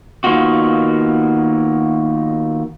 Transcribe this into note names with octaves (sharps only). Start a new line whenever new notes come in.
D#3 A#3 B3 F4 F#4